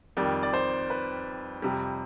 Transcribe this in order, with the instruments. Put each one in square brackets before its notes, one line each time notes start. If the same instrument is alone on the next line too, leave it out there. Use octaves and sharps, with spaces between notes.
[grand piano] F2 D#3 G3 D5
D5
C5
B4
F2 C3 G3